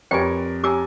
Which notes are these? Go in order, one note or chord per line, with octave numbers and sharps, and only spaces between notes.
F2 G4 A#4 B4 C#5 D5 G5 G#5
G4 C#5 G#5 A#5 D6 E6